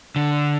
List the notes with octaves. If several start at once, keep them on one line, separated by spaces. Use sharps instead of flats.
D3